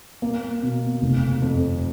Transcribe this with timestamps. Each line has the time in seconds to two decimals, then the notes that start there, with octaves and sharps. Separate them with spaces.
0.22 A#3
0.62 B2
1.02 F1
1.42 F2